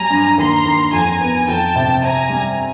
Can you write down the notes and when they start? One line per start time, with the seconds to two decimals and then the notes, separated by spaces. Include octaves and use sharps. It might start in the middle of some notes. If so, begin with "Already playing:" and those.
Already playing: F#3 G3 G#5 A#5
0.10 G2
0.38 D#2 A#5 C6
0.65 D#2
0.93 F2 G#5 A#5
1.20 B3
1.47 F2 G5 A5
1.76 C3
2.02 C4 G#5 A#5
2.30 G3